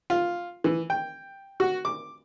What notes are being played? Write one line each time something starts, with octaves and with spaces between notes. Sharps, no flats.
F4
E3
G5
F#4
D6